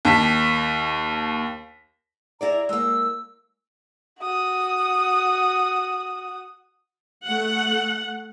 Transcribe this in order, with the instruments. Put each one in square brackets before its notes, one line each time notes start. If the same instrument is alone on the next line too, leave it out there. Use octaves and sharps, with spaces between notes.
[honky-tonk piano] D#2 A5 B6
[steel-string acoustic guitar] E4 G#4 D5 [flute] A#5
[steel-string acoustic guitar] G#3 A#3 [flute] E6
[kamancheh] F#4 D#6
[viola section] A3 F#5